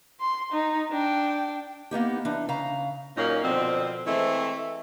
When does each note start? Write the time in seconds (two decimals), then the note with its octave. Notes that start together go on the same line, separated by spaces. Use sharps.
0.21 C6
0.52 D#4
0.92 D4 G5
1.91 A#3 B3 D#4 G4
2.25 E3 D4 D#4
2.49 C#3 F5 A#5
3.16 A#2 F#3 A#3 C#4 D#4
3.43 B2 D3 F3 C4
4.05 E3 G#3 A3 C4